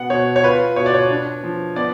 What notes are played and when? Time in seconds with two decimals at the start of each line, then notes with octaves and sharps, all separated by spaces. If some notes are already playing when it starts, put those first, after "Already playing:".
Already playing: B2 B3 F#5
0.10 B2 C#5
0.36 C#5
0.43 F4 B4
0.76 B2 C#5
0.86 D5
0.94 C#5
1.10 D4
1.43 F3
1.76 B3 D5